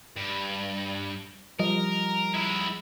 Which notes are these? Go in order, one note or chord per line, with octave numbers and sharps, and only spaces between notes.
G2
F3 G3 A#4 D#5
G#3 E4